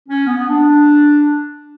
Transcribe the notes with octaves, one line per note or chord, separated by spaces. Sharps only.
C#4
B3
B3
D4